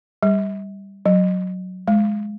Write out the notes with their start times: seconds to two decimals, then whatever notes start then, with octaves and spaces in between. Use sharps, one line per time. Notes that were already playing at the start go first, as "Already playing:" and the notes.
0.23 G3
1.06 F#3
1.88 G#3